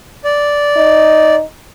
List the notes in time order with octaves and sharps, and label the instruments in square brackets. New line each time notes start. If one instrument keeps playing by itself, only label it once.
[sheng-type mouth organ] D5
[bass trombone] D#4